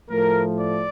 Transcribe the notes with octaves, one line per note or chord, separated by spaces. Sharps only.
A2 F3 A3 A#4
D5